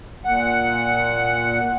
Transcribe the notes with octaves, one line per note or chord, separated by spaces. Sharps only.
A#2 F#5